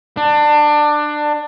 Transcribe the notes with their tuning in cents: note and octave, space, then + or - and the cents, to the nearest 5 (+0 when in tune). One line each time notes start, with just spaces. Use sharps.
D4 +20